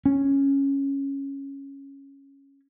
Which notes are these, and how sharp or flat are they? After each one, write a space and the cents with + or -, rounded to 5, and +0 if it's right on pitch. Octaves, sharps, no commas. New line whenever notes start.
C#4 -5